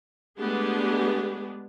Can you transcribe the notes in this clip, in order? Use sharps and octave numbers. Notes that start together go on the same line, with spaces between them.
G#3 A3 B3 D4 G4 G#4